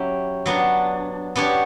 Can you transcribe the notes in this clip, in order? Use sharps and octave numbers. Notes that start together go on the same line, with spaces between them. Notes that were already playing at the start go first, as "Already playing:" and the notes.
Already playing: F#3 C#4 E4 G4
F#3 B3 D4
B3 D4 G4 C#5